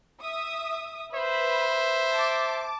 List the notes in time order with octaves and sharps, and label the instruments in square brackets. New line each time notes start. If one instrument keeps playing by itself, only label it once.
[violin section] E5 D#6
[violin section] B4 B5 [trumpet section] C5 E5
[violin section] A5 D6